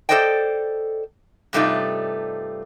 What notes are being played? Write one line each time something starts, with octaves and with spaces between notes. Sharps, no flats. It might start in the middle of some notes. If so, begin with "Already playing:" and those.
A4 A#4 C5 D5 D#5 G5
G2 C3 G3 A3 D#4 F4